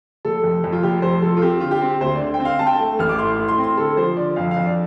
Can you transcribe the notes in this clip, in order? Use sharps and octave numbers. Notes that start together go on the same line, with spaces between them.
F1 A4
F2
F2
F4
F1 G4
F2 C5
F3 A4
F4
C4 G4
D3 F4
G4
C4
D2 C5
D5
D3
G5
C4
F5
C4 A5
G5
A3 A5
A1 F6
D6
A2 C6
A2
C6
C4
C6
D3 A4
F3 C5
D3 D5
F2 F5
F5
F2
D5